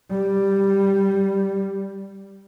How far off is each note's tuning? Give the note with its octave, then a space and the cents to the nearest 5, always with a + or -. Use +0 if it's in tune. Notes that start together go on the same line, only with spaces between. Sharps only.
G3 +0